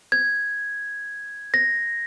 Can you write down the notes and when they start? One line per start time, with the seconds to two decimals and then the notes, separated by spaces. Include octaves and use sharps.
0.12 G#6
1.54 A#6